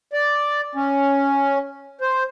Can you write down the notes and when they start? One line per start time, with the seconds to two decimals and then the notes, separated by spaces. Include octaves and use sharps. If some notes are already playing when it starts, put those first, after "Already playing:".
0.13 D5
0.75 C#4
2.01 C5